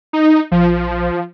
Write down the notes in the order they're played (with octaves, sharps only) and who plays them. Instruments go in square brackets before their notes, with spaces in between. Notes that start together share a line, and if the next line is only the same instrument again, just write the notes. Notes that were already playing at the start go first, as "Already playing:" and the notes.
[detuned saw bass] D#4
[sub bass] A#1 [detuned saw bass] F3